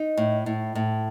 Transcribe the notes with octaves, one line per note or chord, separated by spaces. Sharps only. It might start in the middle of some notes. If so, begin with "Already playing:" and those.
Already playing: D#4
A2
A2
A2